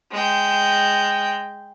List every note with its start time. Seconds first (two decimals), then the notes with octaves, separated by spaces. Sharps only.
0.11 G#3 G5